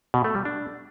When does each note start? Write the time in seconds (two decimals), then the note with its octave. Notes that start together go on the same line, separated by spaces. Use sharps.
0.14 B2
0.24 A3
0.35 G3
0.45 D4